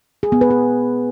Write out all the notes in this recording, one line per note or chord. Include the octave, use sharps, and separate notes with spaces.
G#4
B3
B4
G#4